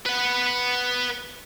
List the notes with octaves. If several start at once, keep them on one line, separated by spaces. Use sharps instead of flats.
B4 F#5